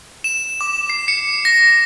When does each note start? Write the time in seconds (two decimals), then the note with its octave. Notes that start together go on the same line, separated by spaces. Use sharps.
0.24 E7
0.61 D6
0.90 C7
1.08 C#7
1.45 A#6